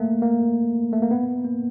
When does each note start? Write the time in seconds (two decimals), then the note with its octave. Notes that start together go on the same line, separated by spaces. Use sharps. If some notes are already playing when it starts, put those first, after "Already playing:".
Already playing: A3 A#3
0.22 A#3
0.93 A3
1.02 A#3
1.11 B3
1.45 A#3